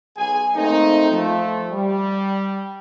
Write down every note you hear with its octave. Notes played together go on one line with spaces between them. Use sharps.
B1 G#4 G#5
A3 A#3 C4 D#4
F3 A3
G3